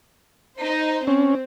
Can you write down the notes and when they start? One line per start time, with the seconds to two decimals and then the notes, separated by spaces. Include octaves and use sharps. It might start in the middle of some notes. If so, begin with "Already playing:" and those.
0.59 D#4 C5
1.07 C4 C#4